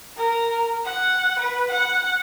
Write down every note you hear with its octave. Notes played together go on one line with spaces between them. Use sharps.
A#4
F#5
B4
F#5